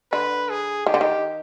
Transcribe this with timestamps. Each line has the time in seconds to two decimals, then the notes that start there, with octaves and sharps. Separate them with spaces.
0.12 D3 B4
0.50 G#4
0.86 D#3 G4
0.94 D3
1.01 D#3